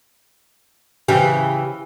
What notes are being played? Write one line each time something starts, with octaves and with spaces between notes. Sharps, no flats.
C#3 E3 G4